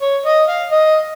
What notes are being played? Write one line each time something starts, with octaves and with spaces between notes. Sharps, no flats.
C#5
D#5
F5
D#5